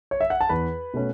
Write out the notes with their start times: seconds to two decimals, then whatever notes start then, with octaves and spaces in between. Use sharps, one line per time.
0.11 C#5
0.21 E5
0.30 F#5
0.41 A5
0.49 E2 B4 B5
0.94 B2 A3 C#4